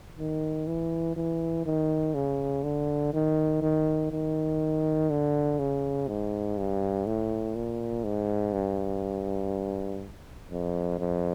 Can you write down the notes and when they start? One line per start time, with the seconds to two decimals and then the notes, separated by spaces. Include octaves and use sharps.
0.18 D#3
0.67 E3
1.16 E3
1.66 D#3
2.14 C#3
2.63 D3
3.13 D#3
3.62 D#3
4.11 D#3
5.10 D3
5.59 C#3
6.08 G#2
6.57 G2
7.06 A2
7.55 A#2
8.04 G#2
8.53 G2
10.50 F2
10.99 F2